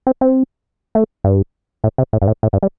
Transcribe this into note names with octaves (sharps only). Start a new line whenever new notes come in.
C4
C4
A3
G2
A2
C3
A2
G2
A2
A2
G2
G3